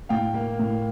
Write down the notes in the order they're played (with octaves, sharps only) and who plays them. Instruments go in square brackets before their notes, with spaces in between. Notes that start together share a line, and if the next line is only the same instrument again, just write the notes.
[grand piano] A2 F5 G5
A#3
A2